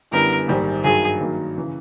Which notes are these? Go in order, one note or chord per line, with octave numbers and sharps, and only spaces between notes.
F#2 D3 G3 B3 E4 A#4
A#1 G#2 D#3 G3
G2 D#3 F#3 G#4
G2 D#3 F#3 A#3
C#3 E3